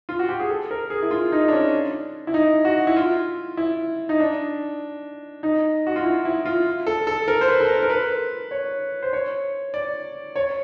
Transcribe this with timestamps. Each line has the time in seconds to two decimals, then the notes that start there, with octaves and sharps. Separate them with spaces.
0.09 F4
0.19 F#4
0.29 G4
0.40 G#4
0.50 A4
0.71 A#4
0.90 G#4
1.02 E4
1.11 F4
1.32 D#4
1.48 D4
1.53 C#4
2.27 E4
2.34 D#4
2.65 F#4
2.87 E4
2.97 F4
3.57 E4
4.09 D#4
4.20 D4
5.43 D#4
5.87 F#4
5.96 F4
6.04 E4
6.25 E4
6.46 F4
6.87 A4
7.07 A4
7.28 A#4
7.41 C5
7.48 B4
7.61 A4
7.68 A#4
7.83 A#4
7.90 B4
8.51 C#5
9.03 C5
9.13 C#5
9.74 D5
10.36 C#5